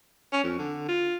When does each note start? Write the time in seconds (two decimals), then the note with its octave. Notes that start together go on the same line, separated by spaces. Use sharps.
0.32 C#4
0.44 F2
0.58 D3
0.88 F4